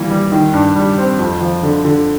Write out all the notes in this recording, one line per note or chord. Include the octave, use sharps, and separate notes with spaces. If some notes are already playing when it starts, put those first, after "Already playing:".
Already playing: E3 G3 A#3
G3
D#3
G2
G3
C4
F2
F3
D3
D3